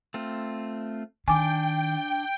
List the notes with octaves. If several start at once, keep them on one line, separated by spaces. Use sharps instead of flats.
A3 C4 F4
D#3 D4 G5 G#5 D6